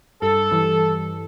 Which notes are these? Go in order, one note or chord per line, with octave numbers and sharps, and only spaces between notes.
G2 A4
E3 G3